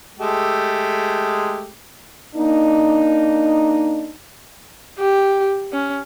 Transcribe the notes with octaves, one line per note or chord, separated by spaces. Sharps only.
G#3 A3 G4
A#3 D4 D#4
G4
C#4